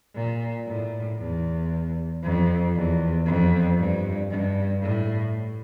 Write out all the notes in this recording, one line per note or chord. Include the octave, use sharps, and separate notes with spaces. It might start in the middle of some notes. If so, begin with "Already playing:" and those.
A#2
A2
E2
F2
E2
F2
G2
G2
A2